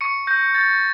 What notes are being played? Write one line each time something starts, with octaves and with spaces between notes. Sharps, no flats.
C#6 C#7
G6 A#6
G6 A6